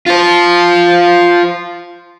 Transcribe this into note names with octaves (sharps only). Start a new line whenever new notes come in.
F4 C5